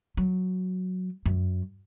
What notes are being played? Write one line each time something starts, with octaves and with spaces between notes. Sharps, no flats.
F#3
F#2